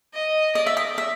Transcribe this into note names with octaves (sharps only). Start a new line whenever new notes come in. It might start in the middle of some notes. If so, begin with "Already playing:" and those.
D#5
D5 D#5
E5
D#5
E5